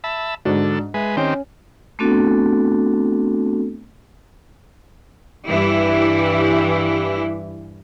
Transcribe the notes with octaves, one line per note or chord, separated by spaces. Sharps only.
E5 A5 B5
G#2 D3 D4 F#4 A4
G#3 B4 E5
D#3 C4 C#4 G4
A3 B3 C4 D4 F#4 A4
G2 E3 E4 G4